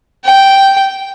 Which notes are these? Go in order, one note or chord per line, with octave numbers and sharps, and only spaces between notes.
G5